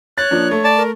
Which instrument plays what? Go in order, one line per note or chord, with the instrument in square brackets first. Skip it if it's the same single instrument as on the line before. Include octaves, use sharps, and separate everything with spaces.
[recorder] C#5 [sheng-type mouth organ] F#6 [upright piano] A6
[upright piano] F3 A#3 D4
A3
[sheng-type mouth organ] D5 A5
[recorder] A#4